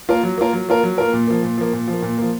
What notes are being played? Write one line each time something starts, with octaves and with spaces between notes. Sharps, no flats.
A#3 F4 A#4
F#3
A#3 F4 A#4
F#3
A#3 F4 A#4
F#3
A#3 F4 A#4
A#2
F3 A#3
A#2
F3 A#3
A#2
F3
A#3
A#2
F3 A#3